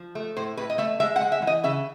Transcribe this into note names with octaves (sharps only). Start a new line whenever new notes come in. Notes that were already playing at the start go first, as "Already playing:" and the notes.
Already playing: F3
A3
A2 C5
A2 B4
D#5
A3 E5
G#3 E5
F#5
G#3
E5
E3
D#5
C#3 E5